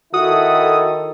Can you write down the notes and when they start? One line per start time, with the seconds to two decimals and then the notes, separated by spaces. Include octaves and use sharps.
0.14 D#3 E4 F#4 A4 D#6